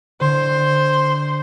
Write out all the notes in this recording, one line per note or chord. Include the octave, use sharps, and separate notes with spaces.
D3 C5